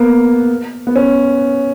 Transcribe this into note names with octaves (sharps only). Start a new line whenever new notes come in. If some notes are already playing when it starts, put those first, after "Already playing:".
Already playing: A#3 B3
B3
C#4